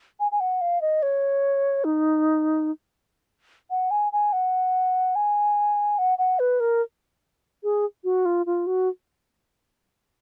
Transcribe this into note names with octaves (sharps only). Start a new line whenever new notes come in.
G#5
G#5
F#5
F5
D#5
C#5
D#4
F#5
G#5
G#5
F#5
G#5
F#5
F#5
B4
A#4
G#4
F#4
F4
F4
F#4